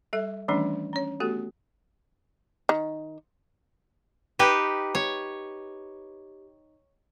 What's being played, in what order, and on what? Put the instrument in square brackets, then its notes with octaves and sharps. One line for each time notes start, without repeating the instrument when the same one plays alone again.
[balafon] G3 A4 E5
D#3 E3 G3 A3 C#4 D4
C#4 C#5
A3 B3 F#4 G4 A4
[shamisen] D#3
[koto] D#4 G4 B4
C#5